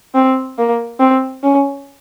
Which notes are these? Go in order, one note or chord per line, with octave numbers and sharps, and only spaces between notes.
C4
A#3
C4
C#4